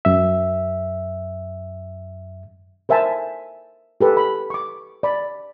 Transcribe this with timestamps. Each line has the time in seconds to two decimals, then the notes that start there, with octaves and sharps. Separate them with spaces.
0.05 F#2 E5
2.89 A#4 C5 E5 G#5 A5
4.01 G4 A4 B4
4.17 B5
4.50 C#6 D6
5.03 D5 B5